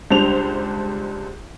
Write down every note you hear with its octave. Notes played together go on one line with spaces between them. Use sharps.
C#2 G3 D4 C5 F7